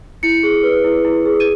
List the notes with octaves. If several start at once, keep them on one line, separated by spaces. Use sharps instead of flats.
E4 C#7
G#4
B4
E4
E4
G#4
D#7